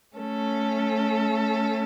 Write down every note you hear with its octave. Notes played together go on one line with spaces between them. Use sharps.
A3 C#4 A4